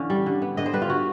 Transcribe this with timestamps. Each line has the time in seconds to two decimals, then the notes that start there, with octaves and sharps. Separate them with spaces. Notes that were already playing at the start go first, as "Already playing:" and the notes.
Already playing: D3 E3 C#4 F5
0.10 G3
0.26 D3
0.42 B3
0.57 D3 D#5
0.66 C5
0.73 G3 B4
0.82 F4
0.89 D3 F#4